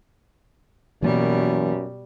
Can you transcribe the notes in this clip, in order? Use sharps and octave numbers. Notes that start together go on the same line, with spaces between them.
F#2 B2 E3 G3 A#3